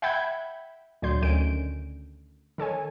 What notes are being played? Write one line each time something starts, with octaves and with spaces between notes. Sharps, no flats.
E5 F#5 G5 B5 G6 G#6
D2 A#2 F#3 D5 C6 G6
D2 D#3 C#4 G6 D7
D#3 A4 C#5 G#5